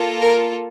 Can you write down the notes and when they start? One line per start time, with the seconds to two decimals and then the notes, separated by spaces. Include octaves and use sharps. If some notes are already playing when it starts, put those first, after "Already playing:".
Already playing: A#3 F4 A4
0.21 A#4